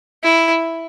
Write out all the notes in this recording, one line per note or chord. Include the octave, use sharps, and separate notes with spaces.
E4